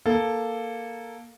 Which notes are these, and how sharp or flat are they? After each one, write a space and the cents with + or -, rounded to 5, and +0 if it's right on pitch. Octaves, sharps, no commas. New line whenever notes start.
A#3 +0 A4 +0